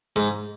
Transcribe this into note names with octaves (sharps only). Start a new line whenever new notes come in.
G#2